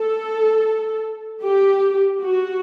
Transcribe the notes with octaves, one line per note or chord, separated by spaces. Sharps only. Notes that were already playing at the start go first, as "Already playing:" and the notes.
Already playing: A4
G4
F#4